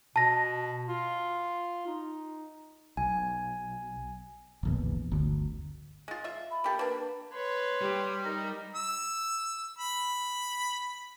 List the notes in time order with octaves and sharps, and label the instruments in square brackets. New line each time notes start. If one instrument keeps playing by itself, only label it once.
[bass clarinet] B2 [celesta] A5 A#6
[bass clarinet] F4
D#4
[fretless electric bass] B1 [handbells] G#5
[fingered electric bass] D1 A#1 E2
G1 D2
[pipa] G#3 F4
F4 E5
[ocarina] B5
[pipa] A#3 G4 A4
[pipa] A#3 D4 [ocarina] B4
[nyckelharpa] B4 C#5 [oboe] C6
[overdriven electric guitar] G3 [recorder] G4
[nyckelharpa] D#4 [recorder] A#4 [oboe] A#5
[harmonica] E6
B5